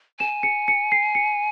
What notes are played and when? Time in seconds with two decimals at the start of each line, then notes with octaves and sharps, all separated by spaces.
0.19 G#5 E7
0.43 C#7
0.68 C#7
0.92 C7
1.15 C#7